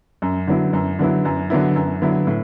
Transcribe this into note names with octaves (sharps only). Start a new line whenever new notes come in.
F#2
D3 F#3 B3 E4
F#2
D3 F#3 B3 E4
F#2
D3 F#3 B3 E4
F#2
D3 F#3 B3 E4
A2